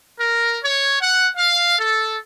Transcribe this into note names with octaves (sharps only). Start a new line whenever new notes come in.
A#4
C#5
F#5
F5
A4